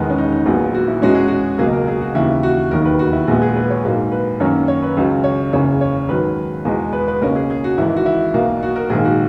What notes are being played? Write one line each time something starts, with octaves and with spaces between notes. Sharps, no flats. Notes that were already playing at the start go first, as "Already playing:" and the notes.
Already playing: E1 E2 D#3 G#3 B3
C#4
D#4
D#4
A#1 A#2 F#3 B3
F#4
E4
E2 B2 G#3 C#4 F#4
G#4
F#4
C#2 B2 F#3 A#3 G#4
A#4
G#4
F#4
D#2 C#3 E3 E4
F#4
E1 D#2 D#3 F#3 A#4
B4
F#4
E4
A#1 A#2 G#3 B3 F#4
G#4
B4
C#5
A#1 G#2 F#3 A#3
B4
F#2 D#3 A#3 C#4 C#5
C#5
B4
C#2 C#3 F#3
C#5
F#1 E2 C#3 C#5
C#5
G#2 D#3 F#3 B4
E2 B2 G#3
B4
B4
C#2 B2 A#3 C#4 A#4
G#4
G#4
F#4
G#1 G#2 E3 E4
F#4
E4
B1 B2 A#3
F#4
A#4
A#1 G#2 D#3 A#3 G#4
F#4